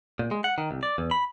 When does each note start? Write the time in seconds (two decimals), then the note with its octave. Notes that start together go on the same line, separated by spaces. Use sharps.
0.19 A#2
0.31 G#3
0.44 F#5
0.58 D#3
0.71 C2
0.83 D5
0.98 E2
1.11 B5